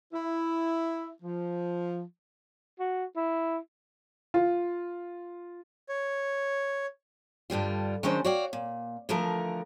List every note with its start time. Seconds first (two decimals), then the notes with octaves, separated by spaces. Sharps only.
0.13 E4
1.23 F3
2.79 F#4
3.16 E4
4.34 F4
5.89 C#5
7.50 G2 D3 G3 F4
8.03 D#3 F#3 G#3 C#4 D4 C5
8.25 F#4 C#5 D5 F5 G5
8.53 A#2
9.09 D3 E3 F3 A3 A#4